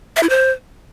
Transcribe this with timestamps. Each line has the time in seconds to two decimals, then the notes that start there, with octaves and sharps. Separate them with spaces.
0.16 E5
0.23 E4
0.30 C5